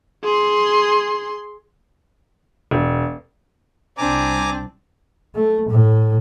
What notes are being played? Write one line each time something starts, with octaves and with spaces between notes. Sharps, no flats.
G#4 C6
E1
C2 G3 C4 D4 G#5 A#5 D6
A3
A2